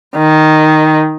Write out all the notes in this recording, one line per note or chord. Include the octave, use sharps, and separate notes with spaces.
D#3